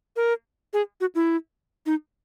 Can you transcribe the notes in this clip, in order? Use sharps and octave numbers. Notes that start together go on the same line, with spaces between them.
A#4
G#4
F#4
E4
D#4